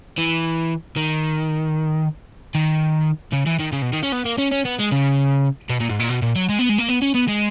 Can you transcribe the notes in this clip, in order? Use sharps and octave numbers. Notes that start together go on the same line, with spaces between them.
E3
D#3
D#3
C#3
E3
D#3
C#3
B2
D#3
C#4
B3
A#3
C#4
C#4
B3
G#3
C#3
B2
A#2
G#2
A#2
B2
A#2
F#3
G#3
B3
G#3
A#3
B3
C#4
B3
G#3